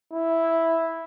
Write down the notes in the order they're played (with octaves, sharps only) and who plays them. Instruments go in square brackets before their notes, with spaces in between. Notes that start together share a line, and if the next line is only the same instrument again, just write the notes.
[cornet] E4